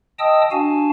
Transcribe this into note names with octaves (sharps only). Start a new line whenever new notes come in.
D#5 G5 A5 D#6 E6
D4 F#4 F5 G#5 A5